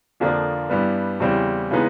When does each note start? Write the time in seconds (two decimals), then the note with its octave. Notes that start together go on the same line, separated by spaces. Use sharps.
0.20 F2 D3 F3 A#3 D4
0.70 G2 E3 G3 B3
1.20 E2 C#3 E3 G3 C4
1.71 C#3 E3 G#3 B3 D#4